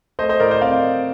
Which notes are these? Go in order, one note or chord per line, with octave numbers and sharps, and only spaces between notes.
A3 C5 D#5
C5 D#5
A2 A#4 D5
C5 D#5
C4 D5 F5